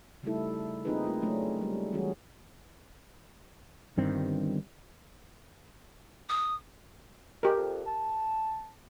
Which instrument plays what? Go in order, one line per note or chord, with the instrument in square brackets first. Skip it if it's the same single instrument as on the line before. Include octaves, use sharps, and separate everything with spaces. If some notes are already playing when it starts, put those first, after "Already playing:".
[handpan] C#3 G3 A3 D#4 E4 A4
A#3 C4 D#4 F4 G#4 B4
A3 F4
F#3 G#3 A3 C#4 D4
G3
E3 G3 C#4 F#4 G#4
[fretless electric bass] G1 G2 D#3 C4
[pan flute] D#6
[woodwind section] D3 F3 G#3 [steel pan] G4 A#4
[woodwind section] F2
A5